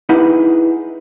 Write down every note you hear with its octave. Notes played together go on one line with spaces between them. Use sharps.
D#4 E4 G4 G#4 B4 F#5